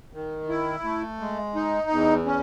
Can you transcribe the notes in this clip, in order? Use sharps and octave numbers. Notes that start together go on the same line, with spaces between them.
D#3
E4
A3
G#3
D#4
E2
C#4